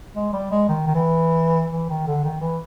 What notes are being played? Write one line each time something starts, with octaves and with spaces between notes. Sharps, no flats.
G#3
G3
G#3
D#3
D#3
E3
E3
D#3
D3
D#3
E3